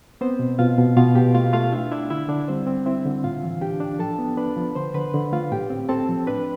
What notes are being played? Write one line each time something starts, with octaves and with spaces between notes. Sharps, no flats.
B3 C4 C5
B2
B2 F4 F5
B2
B2 F4 F5
B2 G4 G5
A3 F4 F5
A3 F4 F5
D4 E4 E5
D4 E4 E5
D3 E4 E5
D3 D4 D5
G3 C4 C5
C4
C4 E4 E5
D3
A2 F4 F5
E3
D4 G4 G5
D4
F3 A4 A5
B3
D4 B4 B5
F3
D3 C5 C6
D3 B4 B5
D3
A3 F4 F5
A2 G4 G5
C4
C4 A4 A5
F3
D4 B4 B5